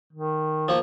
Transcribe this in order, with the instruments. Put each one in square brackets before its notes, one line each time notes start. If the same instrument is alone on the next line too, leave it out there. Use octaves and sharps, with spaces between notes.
[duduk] D#3
[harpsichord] F3 A#3